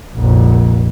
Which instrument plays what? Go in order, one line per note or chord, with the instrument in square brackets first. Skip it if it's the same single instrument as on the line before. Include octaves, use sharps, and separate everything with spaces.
[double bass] F1 A#1